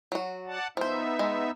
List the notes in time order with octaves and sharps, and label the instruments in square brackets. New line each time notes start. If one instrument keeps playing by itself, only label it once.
[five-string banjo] F#3 F#4
[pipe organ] D5 F#5 A5
[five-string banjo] F3 C5 [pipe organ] B3 D#4 E5
[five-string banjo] G#3